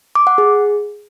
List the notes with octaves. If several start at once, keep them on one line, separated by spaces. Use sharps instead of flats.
D6
F#5
G#4